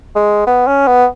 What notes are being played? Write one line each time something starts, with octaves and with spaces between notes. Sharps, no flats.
G#3
B3
C#4
B3